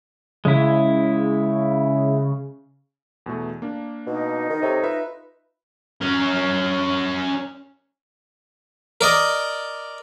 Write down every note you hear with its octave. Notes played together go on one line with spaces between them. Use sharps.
C#3 G#3 E4
E2 B2 A3
A#3 D4
B2 D#4
D#3
C3 A4 C#5 D#5
F4 B4 E5
C#4 A#4
A#4 D5 D#5